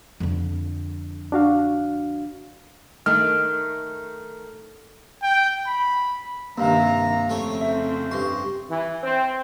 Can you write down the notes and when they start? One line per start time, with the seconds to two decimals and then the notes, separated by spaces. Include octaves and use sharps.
0.20 F2 D3
1.32 D4 F#4 F5
3.06 D#3 A3 F6
5.23 G5
5.67 B5
6.58 G2 C3 D#3 A#3 F5 A#5
7.29 F2 C#3 A3 C4 C#5
7.61 G#2 F4 C5 E5
8.11 G2 C6 C#6
8.70 E3
9.03 C4